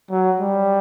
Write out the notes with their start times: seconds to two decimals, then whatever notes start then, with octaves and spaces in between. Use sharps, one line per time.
0.11 F#3
0.40 G3